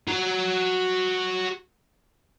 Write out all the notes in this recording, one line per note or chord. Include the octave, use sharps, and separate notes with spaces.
F#4 A#5